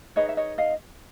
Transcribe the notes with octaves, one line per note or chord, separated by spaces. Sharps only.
D#4 G#4 B4 C#5 D#5
E5
C#5 D#5
D#5 F5